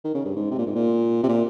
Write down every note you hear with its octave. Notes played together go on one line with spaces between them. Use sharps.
D#3
C#3
G2
G#2
C3
A#2
G#2
A#2
C3
A#2